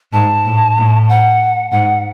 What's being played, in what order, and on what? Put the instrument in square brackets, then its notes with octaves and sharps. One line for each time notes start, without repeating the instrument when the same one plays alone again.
[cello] G#2 [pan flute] A5
[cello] A2
A2
[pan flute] F#5
[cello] G#2 [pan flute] F#5